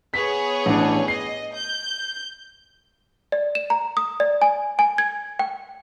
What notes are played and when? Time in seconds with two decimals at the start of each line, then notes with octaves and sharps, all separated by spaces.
0.14 B3 G#4 C#5 B6
0.66 A1 D4
1.08 D#5 C7
1.54 G6
3.32 D5
3.55 E7
3.70 A#5
3.97 D#6
4.20 D5
4.42 G#5
4.79 G#5
4.98 G#6
5.39 G5